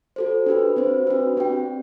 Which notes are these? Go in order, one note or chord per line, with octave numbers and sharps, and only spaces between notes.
F#4 A4 C5
D4 G4 B4
C4 F#4 C5
D4 F#4 B4
C4 G4 D5 G5